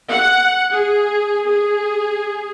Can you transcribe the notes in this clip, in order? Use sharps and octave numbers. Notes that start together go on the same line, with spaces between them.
F#5
G#4
G#4